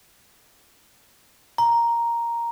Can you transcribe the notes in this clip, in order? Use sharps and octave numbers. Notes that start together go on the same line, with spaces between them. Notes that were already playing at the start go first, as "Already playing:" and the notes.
A#5